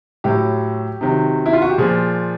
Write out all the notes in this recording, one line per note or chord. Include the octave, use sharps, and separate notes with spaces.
A2 F#3 G4
C3 D#3 F#3
E4
F4
F#4
G4
A#2 F3 G#4